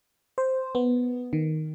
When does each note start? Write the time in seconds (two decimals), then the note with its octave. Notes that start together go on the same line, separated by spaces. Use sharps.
0.38 C5
0.75 B3
1.33 D#3